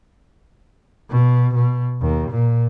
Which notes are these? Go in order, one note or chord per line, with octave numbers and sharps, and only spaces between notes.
B2
B2
D#2
A#2